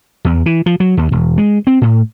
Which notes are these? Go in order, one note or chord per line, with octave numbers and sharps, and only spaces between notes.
E2
E3
F3
F#3
D#2
E1
G#3
C4
A2